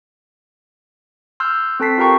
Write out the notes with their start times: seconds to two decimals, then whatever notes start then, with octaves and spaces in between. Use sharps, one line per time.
1.40 C6 E6 F6 G6
1.80 C4 A4 A5 B6 C7
1.98 F4 G4 A#4 G5 A#5 C#6